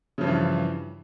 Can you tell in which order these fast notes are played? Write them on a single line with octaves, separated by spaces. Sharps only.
C#3 F3 G2 E3